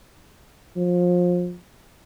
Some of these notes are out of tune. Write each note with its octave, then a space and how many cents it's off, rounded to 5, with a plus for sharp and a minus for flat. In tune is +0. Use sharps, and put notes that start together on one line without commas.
F3 +25